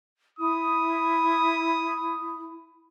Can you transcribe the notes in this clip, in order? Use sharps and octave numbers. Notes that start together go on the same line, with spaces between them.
E4 D#6